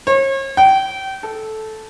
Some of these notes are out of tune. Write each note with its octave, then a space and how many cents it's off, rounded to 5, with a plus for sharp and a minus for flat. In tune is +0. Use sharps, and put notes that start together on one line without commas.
C#5 -40
G5 -25
A4 -10